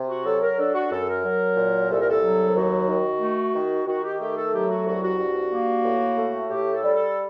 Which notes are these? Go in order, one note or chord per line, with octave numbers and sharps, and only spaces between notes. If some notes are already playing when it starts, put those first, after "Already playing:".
Already playing: C3
F#4
F#3 A4
A#4
D4 A4
F#4
F#2 A4
A#4
F#3
A#2
C2 A4
A#4
A4
F#3
D#2 F#4
D#3
A3
D#3
D#3 F#4
G4
A3 G4
A4
F#3 G4
F#4
C2 F#4
F#4
G2
A#3
A2
A3
A2 G4
A4
G3
A4